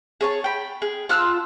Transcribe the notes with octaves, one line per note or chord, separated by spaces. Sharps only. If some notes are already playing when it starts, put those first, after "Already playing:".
G#4 C#5 A5
G5 B5
G#4
F4 A5 E6 F#6